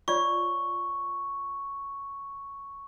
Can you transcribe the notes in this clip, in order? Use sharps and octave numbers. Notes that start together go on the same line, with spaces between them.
F4 C#5 D5 C#6